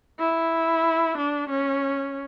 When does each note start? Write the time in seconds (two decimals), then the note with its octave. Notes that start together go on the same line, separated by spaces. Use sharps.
0.20 E4
1.18 D4
1.50 C#4